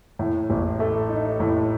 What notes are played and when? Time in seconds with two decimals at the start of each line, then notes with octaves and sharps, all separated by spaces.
0.19 A2
0.50 A1
0.80 A3
1.09 D#4
1.40 A2